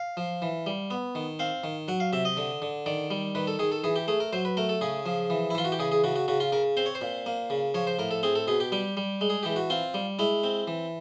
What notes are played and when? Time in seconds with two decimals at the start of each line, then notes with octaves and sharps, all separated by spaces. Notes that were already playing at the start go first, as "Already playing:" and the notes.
Already playing: F5
0.17 F3
0.42 E3
0.66 G3
0.91 B3
1.15 D#3
1.39 C4 F5
1.64 D#3
1.88 F#3 F#5
2.00 F5
2.13 C3 E5
2.25 D#5
2.37 D3
2.62 D3
2.86 D#3 D5
3.11 G3
3.35 D#3 B4
3.47 A4
3.59 D#3 G#4
3.72 A4
3.84 E3 G#4
3.96 G4
4.08 A3 G#4
4.20 A#4
4.33 F#3 C5
4.45 B4
4.57 A3 A#4
4.69 A4
4.81 C#3 G#4
5.06 F3
5.30 E3
5.50 E4
5.55 E3 F4
5.65 F#4
5.72 G4
5.79 C#3 G#4
5.92 G#4
6.04 C#3 F#4
6.16 F#4
6.28 C#3 F#4
6.40 F4
6.52 C#3 A#4
6.77 C4 C5
6.86 C#5
6.95 C5
7.01 A#2
7.26 A#3
7.50 C#3
7.74 F3 C#5
7.87 C5
7.99 A2 A#4
8.11 A4
8.23 C4 G#4
8.35 A4
8.48 B2 G#4
8.60 G4
8.72 G3 G4
8.97 G3
9.21 G#3
9.30 G#4
9.43 E3 G4
9.56 F#4
9.70 C4 F4
9.94 G3
10.19 G#3 E4
10.44 C4
10.67 E3